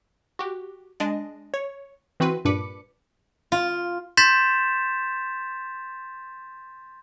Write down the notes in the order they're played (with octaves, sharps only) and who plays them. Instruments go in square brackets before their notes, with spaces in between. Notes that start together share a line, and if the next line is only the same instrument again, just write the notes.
[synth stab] F#4 G4
G#3 D4 D#5
C#5
E3 C4 F#4 B4 C6 D#7
G2 A#2 D4 B4 D6 C#7
[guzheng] F4
[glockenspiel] C6 G6 A6 B6 E7